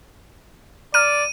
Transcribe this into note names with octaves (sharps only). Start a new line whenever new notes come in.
D5 A#5 F6 D#7